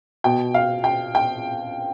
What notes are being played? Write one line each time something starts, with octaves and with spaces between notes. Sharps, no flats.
B2 G5
F5
G5
G5